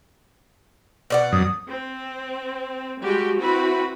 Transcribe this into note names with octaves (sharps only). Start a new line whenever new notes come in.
B2 D5 F#5
F#2 D#6
C4
G3 G#3 F#4 G4
C4 E4 F#4 B4 B5